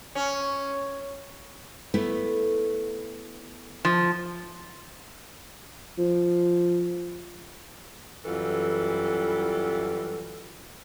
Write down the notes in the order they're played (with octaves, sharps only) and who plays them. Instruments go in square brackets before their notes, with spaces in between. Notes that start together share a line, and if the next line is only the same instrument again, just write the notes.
[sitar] C#4
[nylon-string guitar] A3 B3 E4
[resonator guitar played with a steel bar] F3
[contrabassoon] F3
[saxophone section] F#2 E3 G3 F4 A4